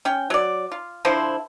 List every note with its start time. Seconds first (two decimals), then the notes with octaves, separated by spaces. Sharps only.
0.05 C#4 G5
0.30 F#3 D5
0.72 F4
1.05 D3 F3 E4 C5